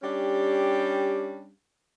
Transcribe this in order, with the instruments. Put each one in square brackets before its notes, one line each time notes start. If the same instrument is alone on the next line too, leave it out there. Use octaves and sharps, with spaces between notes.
[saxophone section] G3 C#4 D4 G4